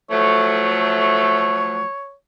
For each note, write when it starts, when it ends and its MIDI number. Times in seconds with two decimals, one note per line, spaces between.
0.10 1.82 53
0.10 1.82 54
0.10 1.82 57
0.10 2.14 73